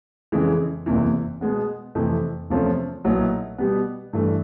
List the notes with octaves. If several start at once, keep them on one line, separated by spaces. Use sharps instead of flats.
F2 C#3 E3 G#3
F#1 E2 C3 E3
B2 G#3 B3
F2 C3 E3 A3
E2 C3 F3 A3 C#4
B1 A#2 F#3 B3 E4
B2 G3 B3
G2 E3 A3